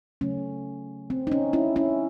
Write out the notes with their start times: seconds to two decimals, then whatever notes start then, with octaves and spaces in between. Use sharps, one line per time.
0.21 C#3 F#3 A3 C#4
1.10 C4
1.27 D#4
1.32 C#4
1.53 C#4 E4
1.76 C#4 E4